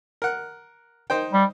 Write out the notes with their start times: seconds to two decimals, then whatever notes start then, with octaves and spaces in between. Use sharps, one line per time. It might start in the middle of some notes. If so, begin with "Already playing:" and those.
0.22 A#4 F#5
1.10 D#4 C5 G5
1.33 G3